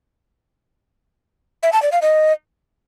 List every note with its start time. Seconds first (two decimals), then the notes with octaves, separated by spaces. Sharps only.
1.63 E5
1.72 A5
1.82 D5
1.92 F5
2.02 D#5